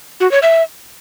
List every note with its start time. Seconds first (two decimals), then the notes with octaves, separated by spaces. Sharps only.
0.20 F#4
0.31 C#5
0.43 E5